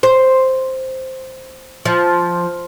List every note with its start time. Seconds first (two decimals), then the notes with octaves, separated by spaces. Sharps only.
0.03 C5
1.85 F3